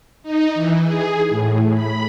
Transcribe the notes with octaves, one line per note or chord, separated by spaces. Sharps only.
D#4
E3
G#4
A2
B5